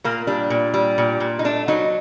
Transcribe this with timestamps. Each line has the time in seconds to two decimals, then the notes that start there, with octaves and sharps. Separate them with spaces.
0.04 A#2 A#3
0.27 G3 D4
0.50 A#2
0.74 G3
0.98 A#2
1.20 A#2
1.39 D#4
1.45 A3 D4
1.68 F#3 D#4